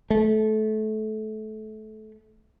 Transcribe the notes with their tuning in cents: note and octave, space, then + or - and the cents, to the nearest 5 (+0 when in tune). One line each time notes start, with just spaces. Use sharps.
A3 -25